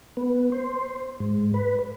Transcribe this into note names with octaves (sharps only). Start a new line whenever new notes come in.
B3
C5
G#2
B4